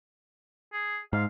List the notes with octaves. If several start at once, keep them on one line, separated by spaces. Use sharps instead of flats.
G#4
G#2 F5